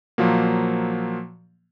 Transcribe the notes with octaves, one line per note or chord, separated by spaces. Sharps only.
A#2 F3 F#3 A#3